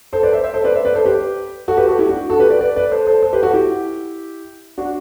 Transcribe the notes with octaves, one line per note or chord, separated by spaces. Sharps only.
A4 C5
B4 D5
C5 E5
C5 E5
A4 C5
B4 D5
C5 E5
B4 D5
A4 C5
G4 B4
F#4 A4
G4 B4
F#4 A4
E4 G4
D4 F#4
F#4 A4
G4 B4
B4 D5
B4 D5
B4 D5
A4 C5
A4 C5
A4 C5
G4 B4
F#4 A4
E4 G4
D4 F#4